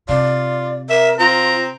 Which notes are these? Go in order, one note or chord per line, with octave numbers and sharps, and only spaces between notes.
C3 F4 D5
A#4 E5
C4 F4 A#5